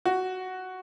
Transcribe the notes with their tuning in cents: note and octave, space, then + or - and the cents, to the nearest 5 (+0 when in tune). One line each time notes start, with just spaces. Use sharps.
F#4 +5